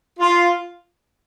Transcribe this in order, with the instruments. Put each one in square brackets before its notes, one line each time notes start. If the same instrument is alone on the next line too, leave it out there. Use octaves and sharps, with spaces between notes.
[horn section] F4